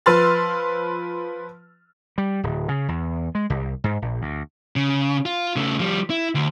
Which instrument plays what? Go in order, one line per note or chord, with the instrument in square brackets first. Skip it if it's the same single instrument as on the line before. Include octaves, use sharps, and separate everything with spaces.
[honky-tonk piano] F3 B4 C6 E6 F6 A6
[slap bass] G3
D1
C#3
E2
G#3
C2
G#2
A#1
D2
[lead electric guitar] C#3
F4
C#3 A3
F3 G3
E4
D2